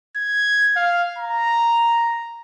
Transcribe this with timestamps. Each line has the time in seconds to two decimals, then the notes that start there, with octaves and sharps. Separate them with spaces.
0.16 G#6
0.76 F5
1.18 A#5